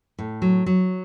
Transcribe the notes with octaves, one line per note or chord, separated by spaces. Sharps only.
A2
F#3
F#3